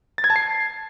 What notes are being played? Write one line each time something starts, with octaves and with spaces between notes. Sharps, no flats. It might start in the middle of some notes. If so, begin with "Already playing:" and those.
A6
G#6
A5
C7